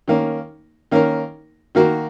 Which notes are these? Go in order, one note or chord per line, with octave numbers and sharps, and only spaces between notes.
D#3 A#3 C#4 A#4
D#3 A#3 C#4 A#4
D#3 A#3 F#4 A#4